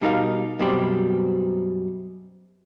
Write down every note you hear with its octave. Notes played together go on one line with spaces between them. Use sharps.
B2 G3 D#4 G4 A#4 F5
F#2 B2 G3 C4 G4 D5